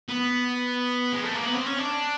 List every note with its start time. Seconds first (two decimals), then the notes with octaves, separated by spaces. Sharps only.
0.09 B3
1.13 G#3
1.23 A3
1.34 A#3
1.44 B3
1.55 C4
1.66 C#4
1.79 D4